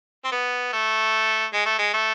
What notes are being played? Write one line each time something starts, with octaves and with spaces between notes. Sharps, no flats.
C4
B3
A3
G#3
A3
G#3
A3